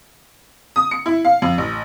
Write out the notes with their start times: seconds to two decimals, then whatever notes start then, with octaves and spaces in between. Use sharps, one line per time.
0.76 D#6
0.91 C#7
1.06 E4
1.25 F5
1.42 F2
1.58 A1